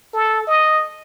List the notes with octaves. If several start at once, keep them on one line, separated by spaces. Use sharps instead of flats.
A4
D#5